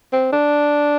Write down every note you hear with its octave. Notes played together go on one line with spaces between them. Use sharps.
C4
D4